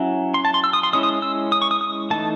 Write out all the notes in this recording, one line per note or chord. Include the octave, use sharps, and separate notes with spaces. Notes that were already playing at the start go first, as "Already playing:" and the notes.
Already playing: F#3 C#4 E4
C6
A5
C6
E6
D#6
C6
G#3 C#4 E4 D#6
D#6
E6
D#6
C#6
D#6
D#6
E3 A3 D#4 A5